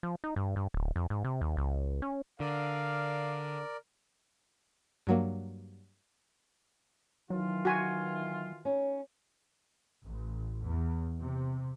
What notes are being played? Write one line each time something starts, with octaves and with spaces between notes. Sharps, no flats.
F3
D#4
G2
G2
D1
F2
G#2
C3
D#2
C#2
C#4
D3 A#4 D5 F5
G2 F#3 A#3
D#3 E3 F#3 F4
F#4 G#5
C#4 D#4 C#5
A1
E2
C3